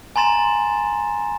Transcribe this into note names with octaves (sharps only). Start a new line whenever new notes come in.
G#5 A#5 C6 A6 E7